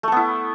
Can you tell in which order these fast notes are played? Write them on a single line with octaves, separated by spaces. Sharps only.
A3 A4 B3 E4